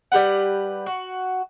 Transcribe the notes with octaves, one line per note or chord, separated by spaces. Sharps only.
G3 G4 B4 F#5
F#4